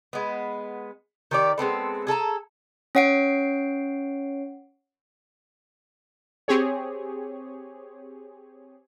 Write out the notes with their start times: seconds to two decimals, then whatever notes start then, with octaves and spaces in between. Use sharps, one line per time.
0.13 G#3 B3
1.31 D#3 G4 D5
1.58 G#3 B3 C4 A4
2.07 G#4 A4 A5 A#5
2.95 C#4 C#5 F#5 C7 D7
6.48 C4 G4 G#4 C#5